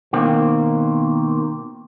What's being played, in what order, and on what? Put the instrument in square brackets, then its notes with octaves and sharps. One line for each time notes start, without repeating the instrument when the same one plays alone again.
[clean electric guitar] B2 D#3 A#3 C4